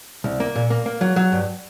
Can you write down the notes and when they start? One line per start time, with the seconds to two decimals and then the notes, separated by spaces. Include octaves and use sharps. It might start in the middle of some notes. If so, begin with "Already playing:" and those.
0.24 C2
0.40 A#3
0.55 A#2
0.70 A#3
0.86 A#3
1.01 F#3
1.16 F#3
1.32 G2